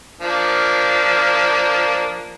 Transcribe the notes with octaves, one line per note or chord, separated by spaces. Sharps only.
F3 A#3 D4